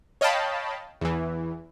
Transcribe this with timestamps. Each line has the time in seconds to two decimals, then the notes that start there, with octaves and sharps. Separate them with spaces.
0.21 C#5 D#5 F5 G5 A5 B5
1.01 E2 E3